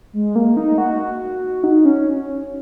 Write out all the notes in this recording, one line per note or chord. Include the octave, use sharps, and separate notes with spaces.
G#3
A#3
D#4
F#4
D#4
C#4